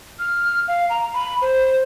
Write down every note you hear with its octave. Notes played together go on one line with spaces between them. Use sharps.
F6
F5
A#5
B5
C5